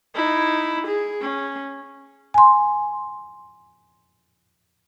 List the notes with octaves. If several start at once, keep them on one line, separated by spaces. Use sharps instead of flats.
D#4 E4
G#4
C#4
G#5 C6